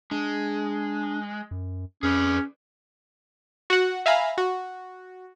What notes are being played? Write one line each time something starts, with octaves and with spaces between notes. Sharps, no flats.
G#3 D4
F#2
F2 C#4 G#4 B4 D5
F#4 F#5
E5 F5 G#5 A#5 B5
F#4